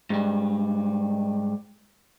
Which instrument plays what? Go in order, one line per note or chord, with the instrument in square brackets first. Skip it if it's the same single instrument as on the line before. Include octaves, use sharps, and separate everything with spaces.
[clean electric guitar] G#2 G3